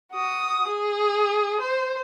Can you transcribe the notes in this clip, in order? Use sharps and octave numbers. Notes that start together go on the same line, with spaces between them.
F#4 D#6
G#4
C5